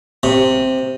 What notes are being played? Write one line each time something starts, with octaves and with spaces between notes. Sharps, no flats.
C3